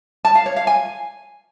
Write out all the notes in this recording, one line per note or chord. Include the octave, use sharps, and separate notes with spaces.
A5
F5
C#5
F5
G#5